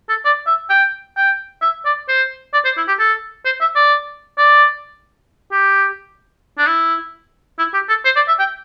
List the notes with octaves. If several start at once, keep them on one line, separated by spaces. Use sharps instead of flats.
A4
D5
E5
G5
G5
E5
D5
C5
D5
C5
E4
G4
A4
C5
E5
D5
D5
G4
D4
E4
E4
G4
A4
C5
D5
E5
G5